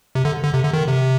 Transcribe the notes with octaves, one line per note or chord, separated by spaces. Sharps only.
C3
D3
D3
C3
D3
D#3
C3